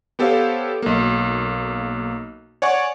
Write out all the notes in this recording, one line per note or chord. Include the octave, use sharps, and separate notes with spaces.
B3 G4 A4 C5 C#5 F5
B1 A#3
C#5 D5 F#5 G#5 C#6